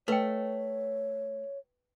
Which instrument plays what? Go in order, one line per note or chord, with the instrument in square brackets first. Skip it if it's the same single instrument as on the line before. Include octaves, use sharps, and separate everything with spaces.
[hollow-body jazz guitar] A3 [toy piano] B4 D#5 G5 [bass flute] C#5